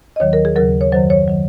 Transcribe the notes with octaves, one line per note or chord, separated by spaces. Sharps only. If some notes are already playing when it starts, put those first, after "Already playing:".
D#5
D#2 D#3 F#3 C#5
A#4
G#4
D#2 C#3 F#3 A#4
C#5
F#2 D#3 F#3 C5
C#5
D#3 F#3